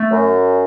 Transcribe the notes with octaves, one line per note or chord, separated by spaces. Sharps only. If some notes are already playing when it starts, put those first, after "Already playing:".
Already playing: A3
F#2